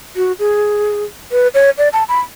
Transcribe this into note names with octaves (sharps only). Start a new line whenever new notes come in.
F#4
G#4
B4
C#5
D5
A5
B5